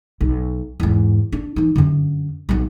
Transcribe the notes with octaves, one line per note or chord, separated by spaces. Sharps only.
B1
E2 G#2
D4
E3 D#4
F#2 D3
B1 F#3